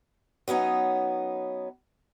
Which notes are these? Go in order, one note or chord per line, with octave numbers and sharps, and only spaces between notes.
F#3 B3 C#4 D#4